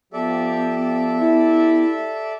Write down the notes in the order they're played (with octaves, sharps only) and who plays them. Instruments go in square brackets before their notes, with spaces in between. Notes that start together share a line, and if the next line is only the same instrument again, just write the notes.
[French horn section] F3 G4 [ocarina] B3 [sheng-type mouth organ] A4 D5 E5
[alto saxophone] E4 [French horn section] G4